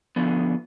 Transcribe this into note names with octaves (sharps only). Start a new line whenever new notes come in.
D3 F3 B3